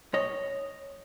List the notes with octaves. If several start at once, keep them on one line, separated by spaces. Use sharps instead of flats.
B1 C#5 D#5